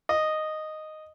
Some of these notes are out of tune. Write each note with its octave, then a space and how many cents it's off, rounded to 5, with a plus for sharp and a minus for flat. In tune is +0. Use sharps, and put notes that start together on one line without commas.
D#5 -5